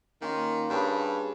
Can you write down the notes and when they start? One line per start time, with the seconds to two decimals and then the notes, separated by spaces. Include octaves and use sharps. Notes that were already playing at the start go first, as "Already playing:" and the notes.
0.22 D#3 A#3 C#4 F4
0.70 G2 G#4 C#5 B5